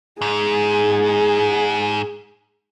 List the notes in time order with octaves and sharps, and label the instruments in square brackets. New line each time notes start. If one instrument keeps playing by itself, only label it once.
[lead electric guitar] G#2 [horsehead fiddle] G#4